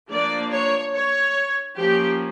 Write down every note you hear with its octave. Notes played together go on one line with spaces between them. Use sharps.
F3 A#3 D4 D5
C#5
C#5
F3 A#3 C#4 G4